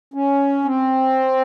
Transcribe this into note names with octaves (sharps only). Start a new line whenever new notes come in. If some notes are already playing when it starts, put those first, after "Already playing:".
C#4
C4